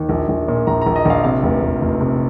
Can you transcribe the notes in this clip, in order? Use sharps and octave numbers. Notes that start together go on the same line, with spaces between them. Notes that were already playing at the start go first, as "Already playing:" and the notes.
Already playing: D#2
A#1
A#1
A#2
A#1 A#5
A#5
A#1
D#5
A#1 F5
C3 F5
F1
F1
F1
C3